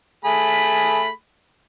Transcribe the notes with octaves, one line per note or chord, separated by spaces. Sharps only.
A3 G#4 B5